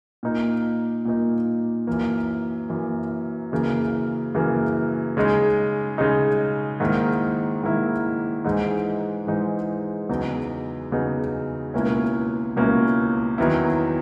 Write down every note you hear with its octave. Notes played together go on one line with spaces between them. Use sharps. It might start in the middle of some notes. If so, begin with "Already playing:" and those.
A#2 A#3 D#4
A#2 A#3 D#4
F#2 E3 A#3
F#2 E3 A#3
F#2 C#3 E3 A#3
F#2 C#3 E3 A#3
C#3 G#3 D#4
C#3 G#3 D#4
G#2 D#3 A#3 E4
G#2 D#3 A#3 E4
G#2 E3 G#3 D#4
G#2 E3 G#3 D#4
E2 C#3 F#3 B3 D#4
E2 C#3 F#3 B3 D#4
C#2 B2 A#3 C#4 E4
C#2 B2 A#3 C#4 E4
E2 D#3 F#3 B3 E4